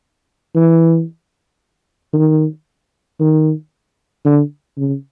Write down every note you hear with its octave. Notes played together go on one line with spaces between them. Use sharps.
E3
D#3
D#3
D3
C#3